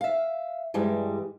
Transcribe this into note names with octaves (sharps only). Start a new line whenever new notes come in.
E5 F5
G2 E3 G3 G#3